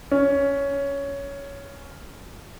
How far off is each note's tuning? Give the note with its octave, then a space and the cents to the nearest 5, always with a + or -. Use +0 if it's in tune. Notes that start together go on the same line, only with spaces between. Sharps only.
C#4 +10